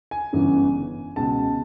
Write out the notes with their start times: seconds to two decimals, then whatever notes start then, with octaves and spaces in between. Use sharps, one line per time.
0.11 G#5
0.33 G1 F#2 C#3 E3
1.16 C#2 B2 A5